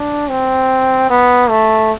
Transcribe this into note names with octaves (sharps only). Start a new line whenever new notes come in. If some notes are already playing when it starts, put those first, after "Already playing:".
Already playing: D4
C4
B3
A3